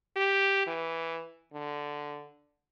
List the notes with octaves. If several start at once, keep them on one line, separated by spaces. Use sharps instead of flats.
G4
E3
D3